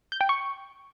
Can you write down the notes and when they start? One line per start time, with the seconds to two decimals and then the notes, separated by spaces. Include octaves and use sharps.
0.12 G6
0.21 G5
0.29 C#6